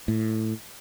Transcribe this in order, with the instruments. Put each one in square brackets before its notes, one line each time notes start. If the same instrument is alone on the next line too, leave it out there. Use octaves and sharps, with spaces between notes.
[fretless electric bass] A2